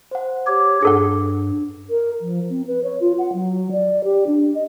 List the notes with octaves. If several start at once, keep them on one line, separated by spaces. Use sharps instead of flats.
C5 F#5
G4 C#5 D6
G2 G#4 A4 F#5
A#4
F3
C4
B4
C#5
F4
F#5
F#3
D5
G4
D4
D#5